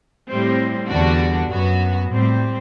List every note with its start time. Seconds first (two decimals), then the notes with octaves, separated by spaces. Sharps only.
0.28 A2 G3 C4
0.89 E2 D3 G3 D4 F#4
1.48 F#2 F#3 B3 F#4
2.09 A2 G3 C4